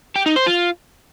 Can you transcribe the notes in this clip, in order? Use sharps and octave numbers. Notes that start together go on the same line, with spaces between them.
G4
D#4
C5
F4